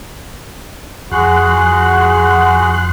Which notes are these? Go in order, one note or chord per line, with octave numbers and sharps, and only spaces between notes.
F2 F#4 G#4 F#5 C6 F#6